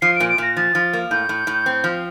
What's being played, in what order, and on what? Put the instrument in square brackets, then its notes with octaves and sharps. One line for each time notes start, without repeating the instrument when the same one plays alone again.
[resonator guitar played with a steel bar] F3 [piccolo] C7
[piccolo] D7
[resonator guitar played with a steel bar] A#2
[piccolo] D7
[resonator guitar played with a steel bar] A#2 [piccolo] A#6
[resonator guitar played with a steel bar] F3 [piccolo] A6
[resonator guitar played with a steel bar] F3
A#3
[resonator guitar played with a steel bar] A2 [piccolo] G6
[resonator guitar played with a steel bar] A2
A2
C4
F3